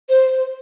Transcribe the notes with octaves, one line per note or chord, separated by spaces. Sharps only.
C5